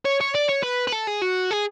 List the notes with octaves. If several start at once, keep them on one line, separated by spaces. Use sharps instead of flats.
C#5
C#5
D5
C#5
B4
B4
A4
G#4
F#4
G#4